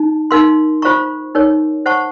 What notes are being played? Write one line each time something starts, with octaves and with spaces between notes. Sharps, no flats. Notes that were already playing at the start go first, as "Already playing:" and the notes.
Already playing: D#4 A5
D#4 A#4 F5 C6
F4 C5 F5 A#5 C#6
D#4 A#4 C#5
C5 F#5 A5 C#6